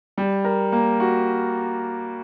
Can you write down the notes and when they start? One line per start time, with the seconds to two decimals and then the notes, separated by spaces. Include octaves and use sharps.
0.18 G3
0.44 A#4
0.72 A#3
1.00 F#4